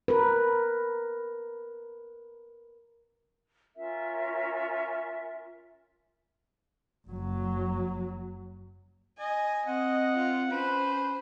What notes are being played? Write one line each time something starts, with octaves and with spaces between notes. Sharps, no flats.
A#4 B4
C#4 F4 A#4 E5
F#1 F#3
D#5 G#5
C4 D#5 F#5
F4
C#4 B4 C5